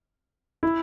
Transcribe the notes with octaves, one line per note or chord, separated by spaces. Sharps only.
E4